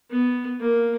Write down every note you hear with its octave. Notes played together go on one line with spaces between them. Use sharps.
B3
A#3